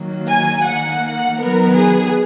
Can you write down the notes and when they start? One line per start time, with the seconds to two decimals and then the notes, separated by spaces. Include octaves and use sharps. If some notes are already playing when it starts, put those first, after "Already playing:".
Already playing: D#3 F#3 A#3
0.29 G#5
0.65 D#3 A#3 F#5
1.39 D#3 F#3 B3 A#4
1.76 G#4